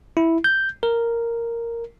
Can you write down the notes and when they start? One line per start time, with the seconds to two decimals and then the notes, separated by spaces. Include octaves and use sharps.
0.17 E4
0.44 G6
0.83 A#4